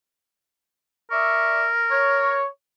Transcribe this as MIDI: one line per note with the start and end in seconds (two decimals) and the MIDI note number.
1.11 2.40 70
1.11 1.66 74
1.11 1.66 76
1.11 1.66 85
1.91 2.44 73